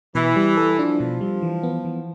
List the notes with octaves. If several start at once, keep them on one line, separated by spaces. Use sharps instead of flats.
B2 E3
G3
A4
F3 D4
B2
G3
E3
B3
E3